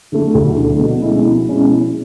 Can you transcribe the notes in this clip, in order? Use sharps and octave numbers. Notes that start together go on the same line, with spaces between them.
D3 A3
D2
D3 A3
B2
G#3 C#4 E4
B2
G#3 C#4 E4
B2